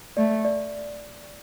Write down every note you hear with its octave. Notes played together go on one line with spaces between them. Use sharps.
A3 D5
D5